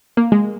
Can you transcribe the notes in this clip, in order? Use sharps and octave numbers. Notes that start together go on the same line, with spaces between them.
A#3
G#3